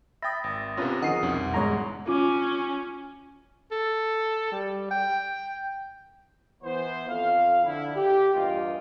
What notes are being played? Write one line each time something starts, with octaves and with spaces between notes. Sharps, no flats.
E5 G5 B5 D#6 A6 A#6
G#1
C3 B3 C#4 F4 B4
D#3 F3 G#4 D#5 F#5 D#6 C7 D#7
C2 F2 B2 C#4
E2 G#2 G#3 C#5 A#5
C#4 F4 D6
A4
G3
G5
E3 B3 C5
F2 F4 A4 F5
D3 E4
G4
E2 G2 A#2 F4 D#5 G5